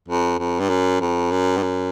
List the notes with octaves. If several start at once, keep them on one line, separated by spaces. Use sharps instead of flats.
F2
F2
G2
F#2
F2
F#2
G2
F#2